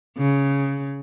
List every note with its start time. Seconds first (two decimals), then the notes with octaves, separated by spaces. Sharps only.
0.17 C#3